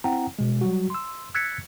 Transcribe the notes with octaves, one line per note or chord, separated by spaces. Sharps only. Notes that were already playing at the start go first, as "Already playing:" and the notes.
C4 E4 F#5 G5 A#5
B2 G#3
F#3 G3 F#4
C6 E6
E6 F#6 G#6 A6 B6 C#7